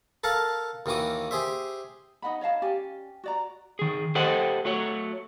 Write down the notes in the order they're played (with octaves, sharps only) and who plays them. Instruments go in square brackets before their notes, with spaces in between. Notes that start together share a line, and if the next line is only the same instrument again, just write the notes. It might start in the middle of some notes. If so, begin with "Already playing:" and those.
[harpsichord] A4 A#4 F5 F#5 A5
D#2 D#3 E3 F#4 D6 D#6
G4 G#4 C5 E5
[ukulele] D#4 D#5 F#5 B5
C#5 D#5 F5 A5
C#4 G4 D5 G#5
F#4 D5 A#5
[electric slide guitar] D#3 G#4
G4 A4 C5 D#5 F#5 G5
A3 F#4 C#5